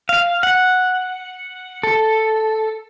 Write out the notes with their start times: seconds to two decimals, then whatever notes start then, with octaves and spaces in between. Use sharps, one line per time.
0.09 F5
0.43 F#5
1.83 A4